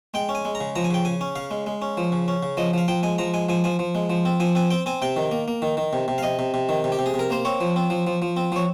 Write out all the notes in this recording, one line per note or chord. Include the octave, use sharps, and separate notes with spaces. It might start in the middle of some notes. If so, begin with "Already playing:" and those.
G#3 G5
C#4
G#5
G#3
A#5
C#3
F3 A#5
G#5
C#3 G5
C#3 G#5
C#4
C#3 F5
G#3
G#3
C#4
F3
C#3
C#4
C#3
F3 D#5
F3 F5
F3 G5
G#3 G#5
F3 A#5
G#3 G#5
F3 G#5
F3 G#5
F3
G#3
F3
C4
F3 G#5
C4 G#5
C4 G5
C4 G#5
C3 G5
D#3
A#3
A#3
D#3
D#3
C3
C3
F5
C3 D#5
C3
C3
D#3
C3
G4
C3
G#4
C3
A#4
A#3 C5
C4 C#5
F3
C4
F3
F3
F3
C4
F3 C#5